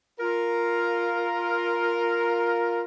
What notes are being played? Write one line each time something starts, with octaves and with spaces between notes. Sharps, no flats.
F4 A#4